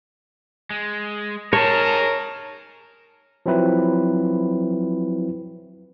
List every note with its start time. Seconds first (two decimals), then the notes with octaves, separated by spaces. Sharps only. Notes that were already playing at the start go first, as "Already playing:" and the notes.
0.70 G#3
1.53 D#4 G#4 A#4 C#5 A5
3.46 F3 F#3 C4 E4 B4